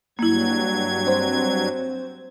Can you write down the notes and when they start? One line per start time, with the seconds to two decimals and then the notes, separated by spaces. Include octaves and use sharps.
0.19 G2 F#3 A#3 E4 G#6
1.07 C4 C5